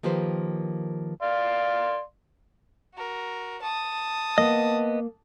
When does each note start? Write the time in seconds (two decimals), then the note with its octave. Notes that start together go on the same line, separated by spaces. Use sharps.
0.03 D#3 F3 A#3 G4 B4 C5
1.22 D5 F5 C6
2.94 F#4 A#4
3.62 A5 D#6
4.38 A#3 B3 D#5